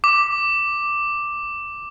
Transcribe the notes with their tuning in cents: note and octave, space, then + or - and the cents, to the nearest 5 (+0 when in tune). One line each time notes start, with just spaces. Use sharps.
D6 +5